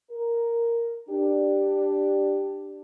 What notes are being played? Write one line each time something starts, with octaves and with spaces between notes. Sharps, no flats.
A#4
D4 G4